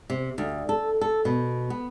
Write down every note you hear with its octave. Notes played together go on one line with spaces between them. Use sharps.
C3
D2
A4
A4
B2
B3